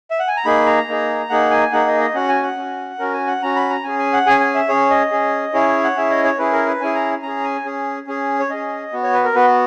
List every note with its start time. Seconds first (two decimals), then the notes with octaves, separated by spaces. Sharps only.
0.11 E5
0.20 F#5
0.28 G#5
0.37 A#5
0.45 A#3 D#4 G#4 B5
0.66 A#5
0.88 A#3 D#4 G#4
1.30 A#3 D#4 G#4 F#5
1.51 G#5
1.72 A#3 D#4 G#4 F#5
1.87 D#5
2.00 D#5
2.14 C#4 F#4 F#5
2.29 G#5
2.43 F#5
2.57 C#4 F#4
2.99 C#4 F#4 A#4
3.13 G#5
3.27 F#5
3.42 C#4 F#4 A#5
3.56 B5
3.70 A#5
3.84 C#4 G#4 G#5
3.99 G#5
4.13 F#5
4.26 C#4 G#4 G#5
4.40 G#5
4.55 E5
4.68 C#4 G#4 C#5
4.90 D#5
5.11 C#4 G#4
5.54 C#4 E4 G#4 C#5
5.84 F#5
5.96 C#4 E4 G#4 E5
6.10 D#5
6.24 C#5
6.38 C#4 E4 G#4 B4
6.52 A#4
6.66 B4
6.81 C#4 E4 G#4 G#5
6.95 A#5
7.23 C#4 G#4 A#5
7.44 G#5
7.65 C#4 G#4
8.07 C#4 G#4
8.40 C#5
8.49 C#4 G#4 D#5
8.93 B3 F#4
9.03 C#5
9.14 B4
9.24 A#4
9.35 B3 F#4 B4